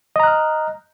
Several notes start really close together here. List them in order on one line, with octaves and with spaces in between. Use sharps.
D#5 A#5 F#6 F6